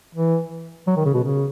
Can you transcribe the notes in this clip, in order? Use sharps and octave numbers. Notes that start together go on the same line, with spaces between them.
E3
F#3
D#3
C#3
B2
C#3